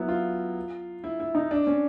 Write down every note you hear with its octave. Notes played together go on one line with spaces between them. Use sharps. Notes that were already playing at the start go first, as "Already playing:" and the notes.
Already playing: F#3 B3 E4
F4
E4
E4
D#4
D4
C#4